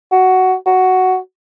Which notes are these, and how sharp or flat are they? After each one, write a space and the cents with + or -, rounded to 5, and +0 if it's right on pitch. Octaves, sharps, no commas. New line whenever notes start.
F#4 +10
F#4 +5